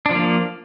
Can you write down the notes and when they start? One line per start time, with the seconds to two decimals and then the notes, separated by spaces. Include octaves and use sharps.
0.06 D4
0.10 F3
0.15 A#3